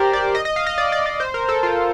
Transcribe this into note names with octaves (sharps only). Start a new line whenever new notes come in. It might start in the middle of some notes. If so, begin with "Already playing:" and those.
Already playing: G4 A#4 C5 D5
D5
D#5
D#5
F5
D#5
D5
D5
D5
C5
A#4
A4
F4